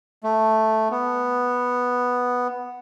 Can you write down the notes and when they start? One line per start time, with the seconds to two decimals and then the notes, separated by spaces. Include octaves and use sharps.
0.24 A3
0.91 B3